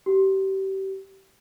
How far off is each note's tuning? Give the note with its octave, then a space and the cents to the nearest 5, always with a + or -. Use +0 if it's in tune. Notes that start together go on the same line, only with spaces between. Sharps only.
G4 -30